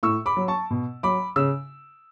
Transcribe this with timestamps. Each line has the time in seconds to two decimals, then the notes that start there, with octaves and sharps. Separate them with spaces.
0.03 A2 C#6 E6
0.26 B5 D6
0.37 F#3
0.48 A5 C#6
0.71 B2
1.03 F#3 B5 D6
1.36 C#3 E6